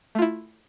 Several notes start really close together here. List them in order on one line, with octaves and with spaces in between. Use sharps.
A3 F4 E4